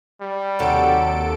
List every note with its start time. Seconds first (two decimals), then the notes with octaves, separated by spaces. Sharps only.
0.21 G3
0.59 D#2 C3 F#3 F#4 A4 D7